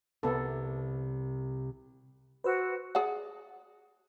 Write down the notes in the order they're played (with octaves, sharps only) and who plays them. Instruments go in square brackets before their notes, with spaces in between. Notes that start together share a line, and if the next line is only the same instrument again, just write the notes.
[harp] C2 [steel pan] B3 A4
[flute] F#4 [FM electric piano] B4 C5 E6
[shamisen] G#4 D5 F#5